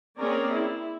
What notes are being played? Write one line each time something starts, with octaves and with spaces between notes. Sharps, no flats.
A#3 C4 C#4 G#4 A#4 D5
E4